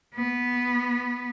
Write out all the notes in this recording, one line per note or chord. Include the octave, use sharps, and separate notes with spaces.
B3